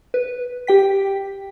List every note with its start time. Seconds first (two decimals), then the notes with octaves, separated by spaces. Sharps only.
0.14 B4
0.67 G4 G5 B6